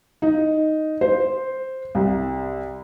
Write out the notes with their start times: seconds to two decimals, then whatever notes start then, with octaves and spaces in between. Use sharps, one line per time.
0.22 D#4
1.01 C5
1.95 C2